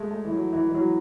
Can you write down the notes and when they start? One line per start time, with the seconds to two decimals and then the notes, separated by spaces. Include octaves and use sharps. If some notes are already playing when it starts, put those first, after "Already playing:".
Already playing: G#3 A3
0.11 A3
0.25 E3
0.32 F#3
0.53 E3
0.69 E3
0.74 F#3